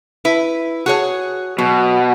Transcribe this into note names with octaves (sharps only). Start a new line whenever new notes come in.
E4 B4
F#4 G#4 C#5
B2 F#3